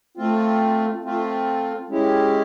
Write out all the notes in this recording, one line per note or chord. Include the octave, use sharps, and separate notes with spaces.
A3 C4 F4
A3 C4 F4
G#3 C#4 E4 G4